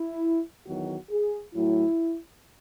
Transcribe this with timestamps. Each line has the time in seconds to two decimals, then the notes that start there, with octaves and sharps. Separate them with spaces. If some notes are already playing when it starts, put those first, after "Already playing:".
Already playing: E4
0.66 E2 D#3 F#3 F#4
1.10 G#4
1.54 A2 F#3 E4